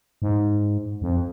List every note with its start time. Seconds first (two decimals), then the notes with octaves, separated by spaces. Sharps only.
0.22 G#2
1.02 F2